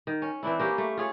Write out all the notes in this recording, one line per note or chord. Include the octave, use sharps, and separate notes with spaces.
D#3
C#4
E3 C4 D4 E4
A#3 C#4 G4
A3
F4 G#4 C#5